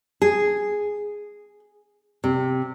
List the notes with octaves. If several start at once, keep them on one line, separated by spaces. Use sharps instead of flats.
G#4
C3